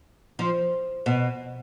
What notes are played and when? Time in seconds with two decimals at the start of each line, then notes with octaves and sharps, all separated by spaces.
0.39 F3
1.06 B2